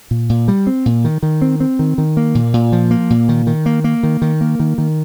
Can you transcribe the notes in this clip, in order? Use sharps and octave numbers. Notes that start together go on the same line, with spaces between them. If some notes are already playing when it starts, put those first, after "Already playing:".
A#2
A#2
G3
C4
A#2
D#3
D#3
C4
C4
D#3
D#3
A#3
A#2
A#2
F3
A#3
A#2
D#3
D#3
A#3
A#3
D#3
D#3
A#3
D#3
D#3